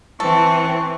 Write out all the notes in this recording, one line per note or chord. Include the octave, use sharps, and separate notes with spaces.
E3 C4 A4 C#6